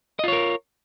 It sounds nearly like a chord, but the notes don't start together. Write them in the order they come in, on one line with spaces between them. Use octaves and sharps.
D#5 F4 C#5 A#4